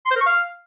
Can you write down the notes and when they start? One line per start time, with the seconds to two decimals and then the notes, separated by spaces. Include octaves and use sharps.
0.06 C6
0.11 C5
0.16 A#4
0.21 C#6
0.26 F5